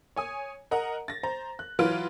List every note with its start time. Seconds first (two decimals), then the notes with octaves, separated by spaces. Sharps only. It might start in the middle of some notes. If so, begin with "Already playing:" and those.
0.16 C#5 G#5 D#6
0.71 A#4 D#5 F#5 A#5
1.08 A6 A#6
1.23 C5 A#5
1.59 F#6
1.79 E3 F#3 F4 B4 F6 D7